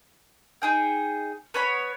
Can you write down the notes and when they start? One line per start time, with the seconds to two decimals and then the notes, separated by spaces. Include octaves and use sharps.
0.62 D#4 G#4 G5
1.54 B3 C#5 B5